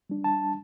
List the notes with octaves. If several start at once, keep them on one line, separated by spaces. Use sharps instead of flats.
G3 D4
A5